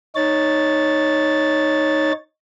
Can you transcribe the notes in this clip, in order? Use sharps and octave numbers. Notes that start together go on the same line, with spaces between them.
D#4 C#5 A6